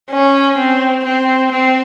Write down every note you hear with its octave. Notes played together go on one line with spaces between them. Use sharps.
C#4
C4
C4
C4